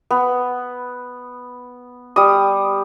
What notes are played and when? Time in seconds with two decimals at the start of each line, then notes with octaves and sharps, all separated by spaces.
0.11 B3
2.16 G3 D#6